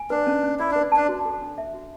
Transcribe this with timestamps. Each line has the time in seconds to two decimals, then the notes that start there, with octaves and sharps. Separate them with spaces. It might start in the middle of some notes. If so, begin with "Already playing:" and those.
Already playing: G#5
0.10 D4 B4
0.27 C#4
0.43 C#4
0.59 E4 D5
0.71 D4 B4
0.92 D4 A5
1.09 F#4
1.25 A4
1.41 D4
1.58 E5
1.74 F#4